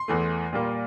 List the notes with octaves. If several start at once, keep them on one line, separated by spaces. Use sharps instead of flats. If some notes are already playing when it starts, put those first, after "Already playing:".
Already playing: C6
E2 E3 A3
A#2 G3 A#3